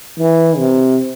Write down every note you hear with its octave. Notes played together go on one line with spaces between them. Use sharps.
E3
C3